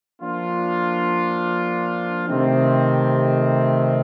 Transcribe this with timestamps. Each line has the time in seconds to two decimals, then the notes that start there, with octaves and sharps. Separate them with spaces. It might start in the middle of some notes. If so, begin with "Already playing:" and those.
0.21 F3 A#3 D4 F4
2.28 C3 D#3 A3 C4